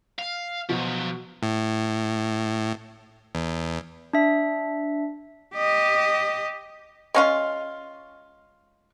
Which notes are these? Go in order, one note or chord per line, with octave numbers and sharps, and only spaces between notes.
F5
B2 F3 F#3
A2
E2
D4 E5
G4 D#5
G#3 C#4 F4